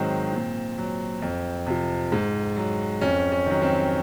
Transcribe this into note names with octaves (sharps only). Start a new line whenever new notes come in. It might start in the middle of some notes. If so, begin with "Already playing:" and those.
Already playing: G#2 D#3 F#3 C4
A#2
F#3
F2
C3 F3
G#2
F#3
F2 C#4
C#4
D#3 F#3
C4